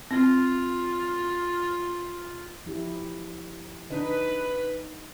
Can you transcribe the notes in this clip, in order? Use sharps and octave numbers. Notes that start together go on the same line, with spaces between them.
C4 F4
F3 E4 G4
D3 D4 D#4 B4 D#5